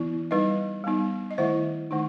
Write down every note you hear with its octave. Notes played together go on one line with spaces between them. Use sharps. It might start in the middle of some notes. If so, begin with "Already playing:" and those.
Already playing: E3 B3 E4
G3 D#4 B4 D#5
G3 B3 D#4
D#5
D#3 A3 E4 C5 E5
D#3 A3 D#4